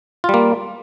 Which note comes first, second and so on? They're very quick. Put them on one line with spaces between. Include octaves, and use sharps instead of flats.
F4 G3 A#3